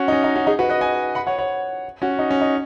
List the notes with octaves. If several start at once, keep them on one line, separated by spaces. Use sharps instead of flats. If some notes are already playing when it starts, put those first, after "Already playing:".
Already playing: C#4 F#4
D#4
C#4
D#4
C#4 F#4
D#4 G#4
F#4 B4
B4 D#5
D#5 G#5
F#5 B5
C#5 F#5
C#5 F#5
C#4 F#4
D#4
C#4
D#4